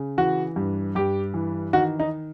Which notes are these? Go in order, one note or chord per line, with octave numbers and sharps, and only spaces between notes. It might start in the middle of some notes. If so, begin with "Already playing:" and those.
Already playing: C#3
E3 F#4
G2
G2 G4
E3
D#3 F#4
D#4